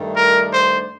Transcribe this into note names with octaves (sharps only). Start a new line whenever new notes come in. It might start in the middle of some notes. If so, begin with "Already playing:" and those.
Already playing: G2 D#3 A3 D4
A#4
C5